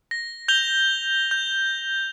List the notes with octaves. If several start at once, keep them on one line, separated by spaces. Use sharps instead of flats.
A#6
G6 F7 G7
G6